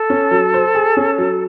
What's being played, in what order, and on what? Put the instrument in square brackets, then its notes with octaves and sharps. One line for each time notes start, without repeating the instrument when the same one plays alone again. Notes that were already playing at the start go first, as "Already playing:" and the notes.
Already playing: [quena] A4
[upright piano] C#4
F#3
C5
G#4
C#4
F#3